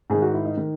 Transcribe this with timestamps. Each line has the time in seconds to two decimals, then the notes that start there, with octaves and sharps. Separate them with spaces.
0.10 G#2 D#3 G#4
0.22 F#4
0.33 E4
0.45 D#4
0.57 D#3